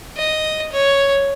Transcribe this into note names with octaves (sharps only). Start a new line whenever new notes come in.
D#5
C#5